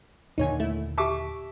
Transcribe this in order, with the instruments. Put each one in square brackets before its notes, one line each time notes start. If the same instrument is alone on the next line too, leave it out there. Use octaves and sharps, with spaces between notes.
[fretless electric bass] D#2 A#2 D3 [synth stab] D#4 C#5 G#5
[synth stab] A3 E4
[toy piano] G4 A5 [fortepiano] E5 C#6 D6